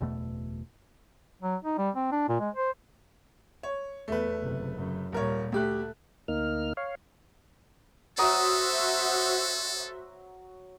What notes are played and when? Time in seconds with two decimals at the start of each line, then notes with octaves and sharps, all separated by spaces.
0.01 F#1 E2 B2 A3
1.42 F#3
1.64 D#4
1.78 G3
1.95 C4
2.12 D4
2.28 A#2
2.40 G#3
2.55 C5
3.63 C#5
4.08 E2 A3 B4
4.42 F#1 C3
4.76 F#2 C#3
5.12 D#1 A#2 G3 A#4 C#5
5.52 D2 A3 G4 F#6
6.28 D2 A#3 D#4 F6
6.77 C#5 F5
8.18 F#3 F#4 A4 C5 E5 A#5 D#6